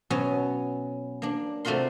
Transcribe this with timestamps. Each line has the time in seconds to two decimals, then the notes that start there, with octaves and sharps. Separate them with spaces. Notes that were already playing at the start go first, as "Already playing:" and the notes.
0.10 B2 F#3 B3 C#4
1.22 A#3 D4
1.65 C3 A3 F4 F#4 A#4 C6